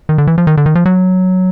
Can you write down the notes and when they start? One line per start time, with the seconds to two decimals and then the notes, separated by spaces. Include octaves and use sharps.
0.09 D#3
0.18 D3
0.27 E3
0.38 F3
0.47 D#3
0.57 D3
0.66 D#3
0.75 F3
0.86 F#3